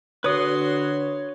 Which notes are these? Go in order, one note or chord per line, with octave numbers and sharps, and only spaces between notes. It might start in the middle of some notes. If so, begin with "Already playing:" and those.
D3 F#4 B4 C#5 C6 D#6